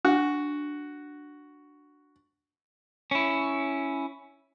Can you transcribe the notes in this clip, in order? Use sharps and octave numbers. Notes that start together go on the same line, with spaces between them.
D4 F#4
C#4 E4